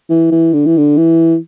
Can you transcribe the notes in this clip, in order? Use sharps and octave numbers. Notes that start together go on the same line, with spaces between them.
E3
E3
D3
E3
D3
E3